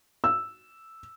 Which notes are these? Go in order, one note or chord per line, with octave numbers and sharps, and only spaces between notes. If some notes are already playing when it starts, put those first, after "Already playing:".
E6